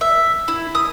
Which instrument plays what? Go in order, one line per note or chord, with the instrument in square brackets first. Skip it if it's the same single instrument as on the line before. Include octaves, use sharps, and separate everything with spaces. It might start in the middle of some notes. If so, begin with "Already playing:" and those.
[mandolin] E5
E4
D#6